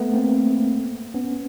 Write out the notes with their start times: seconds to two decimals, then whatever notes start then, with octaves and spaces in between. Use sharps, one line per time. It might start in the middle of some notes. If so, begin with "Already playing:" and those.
Already playing: A3 B3
0.14 A#3 C4
1.14 B3 C#4